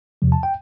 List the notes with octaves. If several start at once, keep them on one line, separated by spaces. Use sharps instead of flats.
E2 C3 F3
A5
G5